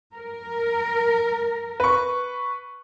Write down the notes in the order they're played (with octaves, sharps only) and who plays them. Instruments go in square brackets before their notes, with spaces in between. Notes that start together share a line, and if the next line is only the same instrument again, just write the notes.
[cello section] A#4
[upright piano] B4 C#6